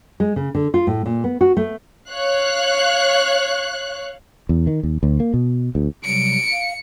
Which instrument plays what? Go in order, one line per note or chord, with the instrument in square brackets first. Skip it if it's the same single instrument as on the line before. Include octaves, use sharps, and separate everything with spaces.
[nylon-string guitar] G#3
C#3
D3
F4
A2
A#2
B3
F#4
A3
[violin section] C#5 F5 F#6
[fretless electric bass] E2
D#3
D#2
D2
A#3
B2
D2
[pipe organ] C3 F#3 G3 [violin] C#7 [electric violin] D7
[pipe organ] F5